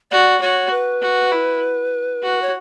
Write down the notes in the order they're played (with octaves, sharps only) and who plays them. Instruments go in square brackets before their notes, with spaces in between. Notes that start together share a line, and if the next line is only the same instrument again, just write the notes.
[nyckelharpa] F#4 [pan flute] D5
[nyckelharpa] F#4 [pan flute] C#5
[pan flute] B4
[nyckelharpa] F#4
E4
F#4
[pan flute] C#5